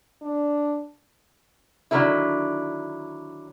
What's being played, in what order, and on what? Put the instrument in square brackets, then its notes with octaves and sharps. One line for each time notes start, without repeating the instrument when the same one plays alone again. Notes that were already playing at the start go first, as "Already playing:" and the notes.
[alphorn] D4
[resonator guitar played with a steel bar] D3 D#3 F#3 A3 E4